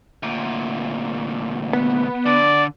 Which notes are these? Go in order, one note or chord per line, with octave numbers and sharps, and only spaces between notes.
D2 A#2
B3
D3 D5